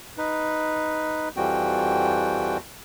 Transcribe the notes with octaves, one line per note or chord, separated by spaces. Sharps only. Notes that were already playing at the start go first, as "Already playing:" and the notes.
D#4 B4
F2 E3 F3 G3 F#4 G5